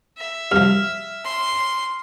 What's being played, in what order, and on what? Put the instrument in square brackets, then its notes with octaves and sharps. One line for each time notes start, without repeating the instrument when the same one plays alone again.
[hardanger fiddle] E5
[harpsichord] C2 F3 [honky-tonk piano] F6
[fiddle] C6